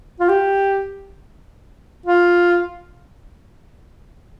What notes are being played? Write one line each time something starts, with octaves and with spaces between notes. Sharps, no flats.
F4
G4
F4